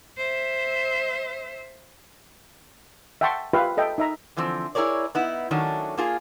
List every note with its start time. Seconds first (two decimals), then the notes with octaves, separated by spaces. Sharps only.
0.17 C5 E5
3.21 E5 F#5 G5 A5 C6 C#6
3.53 F4 G4 B4 E5 F5
3.77 A4 D#5 E5 G5
3.98 D#4 E5 A#5
4.37 D3 E3 F3 C4
4.75 E4 G#4 A#4 C#5 D5
5.15 B3 D#4 E4
5.51 D#3 F#3 A3 C#4 D4
5.98 A#3 F4 G#4